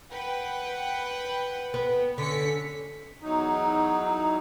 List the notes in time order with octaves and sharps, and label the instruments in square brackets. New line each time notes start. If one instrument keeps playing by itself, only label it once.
[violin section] B4 F#5 G5
[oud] B3
[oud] D3 [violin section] C#4 B6 C#7
[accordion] E2 F#3 D#4